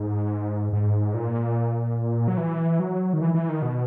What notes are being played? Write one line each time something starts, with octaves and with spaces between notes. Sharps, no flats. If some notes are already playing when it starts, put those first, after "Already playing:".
Already playing: G#2
G#2
A#2
F#3
E3
F#3
D#3
E3
E3
D#3
B2